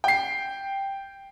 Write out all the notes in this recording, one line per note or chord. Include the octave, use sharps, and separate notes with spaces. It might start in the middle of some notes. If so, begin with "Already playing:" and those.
G5 C7